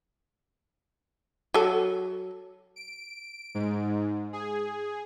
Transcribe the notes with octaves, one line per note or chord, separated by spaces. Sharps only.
F#3 A4
D7
G#2
G#4